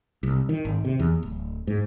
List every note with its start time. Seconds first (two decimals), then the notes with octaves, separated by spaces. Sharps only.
0.23 C2
0.49 D#3
0.65 G#1
0.85 C3
1.00 E2
1.23 D1
1.67 G#2